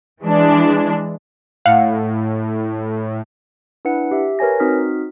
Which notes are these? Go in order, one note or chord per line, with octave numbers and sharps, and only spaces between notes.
E3 G#3 D4
A2 F5 F#5
D4 E4 B4 F#5 C#7
G4 E5
A#4 B4 C#5 G#5 A#6
C4 D#4 F#4 D#6 F6 B6